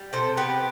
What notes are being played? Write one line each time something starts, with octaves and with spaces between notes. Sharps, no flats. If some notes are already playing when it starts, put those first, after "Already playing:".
Already playing: G3
C3 A4 C5
B3 G4 B4